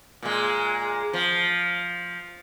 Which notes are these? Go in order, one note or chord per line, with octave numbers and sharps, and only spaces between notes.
A#2 G#3
F3